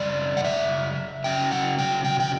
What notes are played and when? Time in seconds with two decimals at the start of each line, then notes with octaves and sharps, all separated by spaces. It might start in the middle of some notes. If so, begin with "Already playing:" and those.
Already playing: F#2 C#3 G3 D5
0.37 F#5
0.45 E5
1.24 C#3 F#3 C#4 G5
1.52 F#5
1.79 G5
2.04 G5
2.20 G5